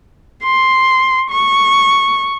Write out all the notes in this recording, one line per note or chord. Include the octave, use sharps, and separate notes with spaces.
C6
C#6